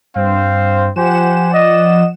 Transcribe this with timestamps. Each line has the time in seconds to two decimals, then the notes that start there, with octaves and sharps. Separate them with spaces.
0.16 G2 C4 C5 F5
0.96 F3 G4 C5 F#5 G#5 E7
1.52 D5 D#5